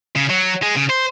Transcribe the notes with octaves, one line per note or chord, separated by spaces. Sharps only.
C#3
F#3
G#3
C#3
C5